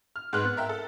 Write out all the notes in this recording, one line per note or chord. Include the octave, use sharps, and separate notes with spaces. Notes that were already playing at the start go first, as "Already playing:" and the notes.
F6
G#2 G#3 B4 F6 F#6
B3
A#4 E5 G5
A4